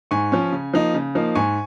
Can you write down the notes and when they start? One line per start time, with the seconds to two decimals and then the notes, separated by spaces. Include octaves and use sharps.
0.11 G#2 G#5 C#6
0.32 F3 C#4
0.52 C#3
0.74 F3 A#3 D#4
0.94 C#3
1.15 F3 A#3 D#4
1.35 G#2 G#5 C#6